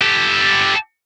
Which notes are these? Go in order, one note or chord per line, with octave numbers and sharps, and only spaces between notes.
G4 A4